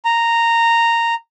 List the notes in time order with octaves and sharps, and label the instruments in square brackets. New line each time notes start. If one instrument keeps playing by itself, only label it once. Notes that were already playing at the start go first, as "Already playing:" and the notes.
[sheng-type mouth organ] A#5